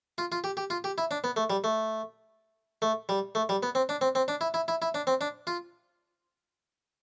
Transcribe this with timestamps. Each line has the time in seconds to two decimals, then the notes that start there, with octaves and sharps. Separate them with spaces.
0.18 F4
0.32 F4
0.44 G4
0.57 G4
0.70 F4
0.84 G4
0.98 E4
1.11 D4
1.24 B3
1.36 A3
1.50 G3
1.64 A3
2.82 A3
3.09 G3
3.35 A3
3.49 G3
3.63 B3
3.75 C4
3.89 D4
4.01 C4
4.15 C4
4.28 D4
4.41 E4
4.54 E4
4.68 E4
4.82 E4
4.94 D4
5.07 C4
5.21 D4
5.47 F4